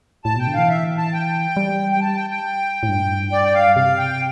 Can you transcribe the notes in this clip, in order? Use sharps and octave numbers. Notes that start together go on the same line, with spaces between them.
A2 A5
B2 G5
D3
E3 F5
E5
A5
G5
G3
G5
A5
G5
G5
A2
G2
D5
G5
F5
C3 F5
G5